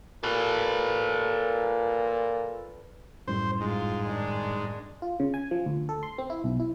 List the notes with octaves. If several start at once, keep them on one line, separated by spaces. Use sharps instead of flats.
A#2 A4 B4
F#2 A2 G3 C5
G#2 F4
D#3 G#3 D4
F4
C#3
G#5
F3
D2
A4
C6
C4
E4
B1
E4